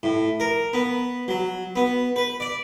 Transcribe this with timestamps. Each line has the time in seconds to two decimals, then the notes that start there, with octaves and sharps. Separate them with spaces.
0.03 A2
0.40 A#4
0.73 B3
1.28 F#3
1.76 B3
2.16 B4
2.40 D5